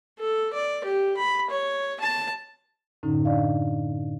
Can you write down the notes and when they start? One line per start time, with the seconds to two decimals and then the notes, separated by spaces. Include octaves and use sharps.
0.19 A4
0.53 D5
0.84 G4
1.17 B5
1.50 C#5
2.00 A5
3.03 F#2 A2 D3 C#4 D#4
3.25 D4 D5 D#5 F5